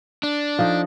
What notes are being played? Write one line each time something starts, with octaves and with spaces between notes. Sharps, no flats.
D4
F3 D#4 A4